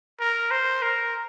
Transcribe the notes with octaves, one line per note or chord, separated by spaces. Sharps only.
A#4
C5
A#4